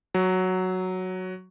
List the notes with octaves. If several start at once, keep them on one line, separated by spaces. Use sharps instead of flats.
F#3